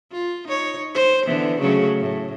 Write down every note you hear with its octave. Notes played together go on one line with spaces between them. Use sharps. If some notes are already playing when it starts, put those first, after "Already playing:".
F4
D#4 C#5
C5
D3 E3 B3
C#3 F#3 A3
A2